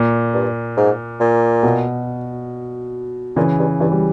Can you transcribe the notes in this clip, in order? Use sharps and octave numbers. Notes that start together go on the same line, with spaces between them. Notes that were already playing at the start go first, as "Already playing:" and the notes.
Already playing: A#2
G2
G#2
A#2
B2
A#2 C#3 E3
G2
G2 E3
G3